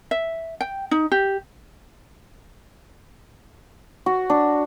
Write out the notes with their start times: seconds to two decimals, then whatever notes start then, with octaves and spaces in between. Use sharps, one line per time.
0.11 E5
0.61 G5
0.91 D#4
1.12 G4
4.06 F#4
4.30 D4